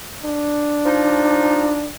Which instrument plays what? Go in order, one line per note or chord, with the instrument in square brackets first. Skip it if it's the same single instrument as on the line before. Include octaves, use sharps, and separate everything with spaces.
[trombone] D4
[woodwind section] F3 D#4